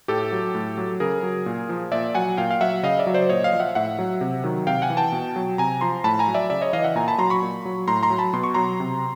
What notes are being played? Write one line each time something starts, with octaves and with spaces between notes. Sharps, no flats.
A2 G4 A4
F#3
A2
F#3
C#3 G#4 A#4
F#3
A#2
F3
A#2 D5 E5
F#3 F#5 G#5
A#2 F5 G5
F5
F#3 E5 F#5
C#3 D#5 F5
D5 E5
F#3
C5 D5
A#2 C#5 D#5
D#5 F5
F3
E5 F#5
A2 E5 F#5
F#3
C3
D#3 F#3
C3 F5 G5
F#5 G#5
E3
G5 A5
B2
F#3
C3 G#5 A#5
F3 A#5 C6
A2 A5 B5
G#5 A#5
F#3
D5 E5
C#3 D5 E5
C#5 D#5
E3 D#5 F5
E5 F#5
A#2 G#5 A#5
A5 B5
F#3 A#5 C6
B5 C#6
A#2
F#3
A2 A#5 C6
A#5 C6
F#3
A5 B5
B2 C6
C#6
F#3 A#5 C6
C3